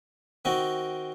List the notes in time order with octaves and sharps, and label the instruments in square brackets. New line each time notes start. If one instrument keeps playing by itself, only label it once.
[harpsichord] D#3 C4 F#4